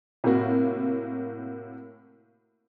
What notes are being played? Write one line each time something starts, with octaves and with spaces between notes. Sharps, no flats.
A2 C3 A#3 F#4